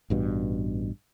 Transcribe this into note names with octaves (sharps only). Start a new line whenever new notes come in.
A1 G2 B2